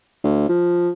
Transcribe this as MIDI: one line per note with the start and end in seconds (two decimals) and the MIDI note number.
0.24 0.45 38
0.49 0.90 53